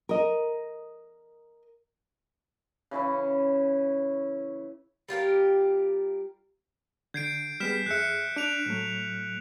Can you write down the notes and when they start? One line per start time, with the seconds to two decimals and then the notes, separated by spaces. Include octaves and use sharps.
0.09 A#4 D#5
2.91 C#3 E3 C#4 E4
5.09 G3 F4 G4 A#4
7.14 D3 G6 G#6 C7 D7
7.60 G3 B3 G#4 F6 B6 E7
7.86 F2 G#4 E5 F#6 C#7
8.36 D4 F#6 D7 F7
8.66 A2 F#3 A3